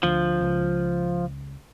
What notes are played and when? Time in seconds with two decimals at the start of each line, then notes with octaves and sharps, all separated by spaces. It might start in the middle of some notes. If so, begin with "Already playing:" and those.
0.03 D2 F3
0.41 C#2